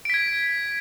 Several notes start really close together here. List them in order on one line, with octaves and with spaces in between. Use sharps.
D7 B6 G#6